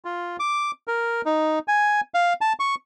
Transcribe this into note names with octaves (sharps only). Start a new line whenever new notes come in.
F4
D6
A#4
D#4
G#5
F5
A5
C#6